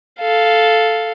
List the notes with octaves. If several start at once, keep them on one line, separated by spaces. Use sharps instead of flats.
A4 F5